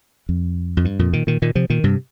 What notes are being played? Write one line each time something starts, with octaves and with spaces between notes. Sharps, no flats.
F2
F2
G2
F2 A#2
A#2 D#3
A#2 D#3
A#2 D#3
C3 F3
A#2 D#3
G2 C3